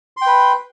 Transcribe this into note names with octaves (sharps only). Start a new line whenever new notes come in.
B4 G5 C6